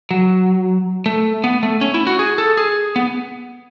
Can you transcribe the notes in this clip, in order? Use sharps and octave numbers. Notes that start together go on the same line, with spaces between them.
F#3
A3
B3
A3
C#4
E4
F#4
G#4
A4
G#4
B3